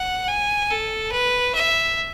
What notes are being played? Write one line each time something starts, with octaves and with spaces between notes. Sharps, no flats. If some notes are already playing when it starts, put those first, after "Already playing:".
Already playing: F#5
G#5
A4
B4
E5